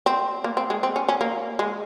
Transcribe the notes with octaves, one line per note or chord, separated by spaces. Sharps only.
C4
A#3
C4
G#3
C4
C#4
C#4
A#3
G#3